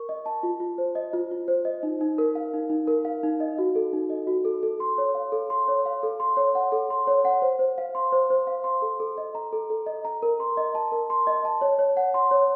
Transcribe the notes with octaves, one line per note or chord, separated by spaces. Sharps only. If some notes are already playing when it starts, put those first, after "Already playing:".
Already playing: A#4 C#6
D#5
A5
F4
F4
C5
D#5
F4
F4
C5
D#5
D#4
D#4
A#4
F5
D#4
D#4
A#4
F5
D#4
D#5
F#4
A4
D#4
D#5
F#4
A4
A4
C6
C#5
F5
A4
C6
C#5
F5
A4
C6
C#5
F#5
A4
C6
C#5
F#5
C5
C5
F5
C6
C5
C5
F5
C6
A4
A4
D#5
A#5
A4
A4
D#5
A#5
A#4
C6
D#5
A5
A#4
C6
D#5
A5
C#5
C#5
F#5
C6
C#5